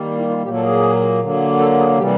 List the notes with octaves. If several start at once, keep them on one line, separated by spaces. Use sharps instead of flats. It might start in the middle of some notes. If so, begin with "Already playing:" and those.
Already playing: D#3 G3 A#3
E4
F4
A#2 F#3 A#3 G4
A4
G#4
D3 F#3 A#3
A4
G#4
C3 E3 G3 G4